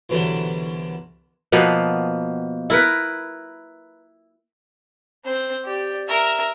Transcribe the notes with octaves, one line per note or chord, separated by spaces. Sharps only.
C2 B2 D3 E3 F#3
B2 F3 A#3 B3
E4 A#4 B4
C4 C5
G4 D5
A#4 E5